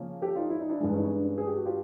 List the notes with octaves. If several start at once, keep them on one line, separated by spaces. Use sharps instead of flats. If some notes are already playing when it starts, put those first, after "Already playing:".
Already playing: C#3 F3 A#3 C#4
G4 A4
D#4 F4
E4
D#4
D4 E4
G2 E3 G#3
C#4 D#4
C#4
D4
C#4
G#4
G4
F#4
F4 G4